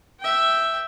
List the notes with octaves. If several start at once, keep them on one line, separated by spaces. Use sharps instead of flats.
E5 G5